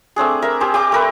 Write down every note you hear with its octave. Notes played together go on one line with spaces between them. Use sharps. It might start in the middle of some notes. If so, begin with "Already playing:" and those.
A3 C4 D4 G#4
A#4 E5 E6
G4 G#4 C5
G4 G5 D6
A3 A#4 B4